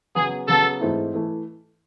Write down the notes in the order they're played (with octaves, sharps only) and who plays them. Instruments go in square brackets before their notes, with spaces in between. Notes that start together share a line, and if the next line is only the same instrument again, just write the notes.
[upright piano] C#3 F#3 B3 [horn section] G#4
[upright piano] C#3 F#3 B3 [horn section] A4
[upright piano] G#2 E3 A3 C4 E4
E3 A3